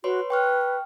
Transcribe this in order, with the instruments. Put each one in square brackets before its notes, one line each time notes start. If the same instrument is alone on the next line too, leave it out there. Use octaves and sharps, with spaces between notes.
[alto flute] F#4 [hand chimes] B4 C#5 C6
[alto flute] B4 [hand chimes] G5 C#6 F6